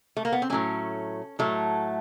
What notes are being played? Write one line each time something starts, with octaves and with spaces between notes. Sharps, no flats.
A3
A#3
B3
C4
A2 F#3 A3 C#4
A2 F#3 A3